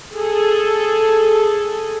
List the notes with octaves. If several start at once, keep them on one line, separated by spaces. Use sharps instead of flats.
G#4 A4